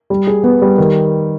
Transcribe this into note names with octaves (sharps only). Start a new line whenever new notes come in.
G3
G#4
B3
G3
D#3